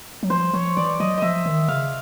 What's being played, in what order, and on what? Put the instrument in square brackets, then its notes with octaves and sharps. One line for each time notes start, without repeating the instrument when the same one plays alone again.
[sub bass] F#3
[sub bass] F3 [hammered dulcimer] C5
[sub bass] F3 [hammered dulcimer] C#5
[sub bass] E3 [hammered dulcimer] D5
[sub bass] F#3 [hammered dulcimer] D#5
[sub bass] F3 [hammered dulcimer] D#5 E5
[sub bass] D#3
[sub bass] C#3 [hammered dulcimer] F5